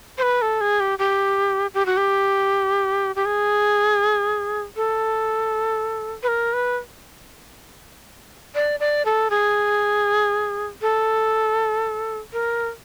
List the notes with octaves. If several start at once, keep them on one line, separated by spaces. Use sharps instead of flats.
C5
B4
A4
G#4
G4
G4
G4
F#4
G4
G4
G#4
A4
B4
A#4
B4
D5
D5
A4
G#4
A4
A#4